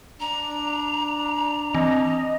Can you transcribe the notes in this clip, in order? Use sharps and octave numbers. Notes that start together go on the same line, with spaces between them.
D4 A#5
E3 C4 D#5